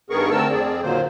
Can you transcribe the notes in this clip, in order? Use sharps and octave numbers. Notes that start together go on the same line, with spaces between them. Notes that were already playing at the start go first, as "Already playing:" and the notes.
G2 D#3 B3 G#4 A#4 C#6
D3 A3 C4 A#4 A5 E6
F2 C4 G#4 D5
A#2 D3 D#3 F#3 A#3 C5